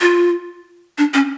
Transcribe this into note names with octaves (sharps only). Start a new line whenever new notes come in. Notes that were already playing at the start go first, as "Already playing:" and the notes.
F4
D4
C#4